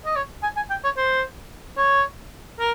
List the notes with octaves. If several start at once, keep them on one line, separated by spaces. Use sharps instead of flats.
D#5
C#5
G#5
G#5
G5
C#5
C5
C#5
A#4